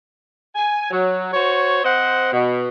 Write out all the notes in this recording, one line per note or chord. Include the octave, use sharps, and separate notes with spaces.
G#5
F#3
F#4 C5 C#5
C4 C5 D#5 F#5
B2